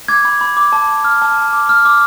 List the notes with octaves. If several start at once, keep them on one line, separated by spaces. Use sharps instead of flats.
D6 G#6
B5
B5
D6
A5
A5
F6
A5
A5
D6
F6
D6